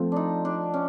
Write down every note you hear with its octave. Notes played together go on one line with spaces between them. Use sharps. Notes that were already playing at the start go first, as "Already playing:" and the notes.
Already playing: F3 A3 C4 F4
D4 D#4
D4
C#4